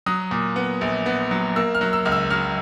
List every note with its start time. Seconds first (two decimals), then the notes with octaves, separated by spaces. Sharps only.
0.06 F#3 D#6
0.31 A#2
0.56 B3
0.81 A#1
1.06 B3
1.31 F#3
1.56 A#3 E6
1.75 F6
1.81 F#3
1.93 E6
2.05 C#2 F6
2.12 E6
2.30 F#3 F6